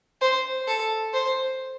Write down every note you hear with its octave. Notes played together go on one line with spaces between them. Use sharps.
C5
A4
C5